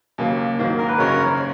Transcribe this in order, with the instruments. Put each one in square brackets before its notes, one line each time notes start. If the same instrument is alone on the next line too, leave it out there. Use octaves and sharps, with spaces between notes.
[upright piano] D#2 C#3 F#3 A#3
G#2 D#3 F#3 A#3
[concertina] A#4
B4
[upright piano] F#1 F#2 C#3 G#3 C#4 [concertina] A#4 C#5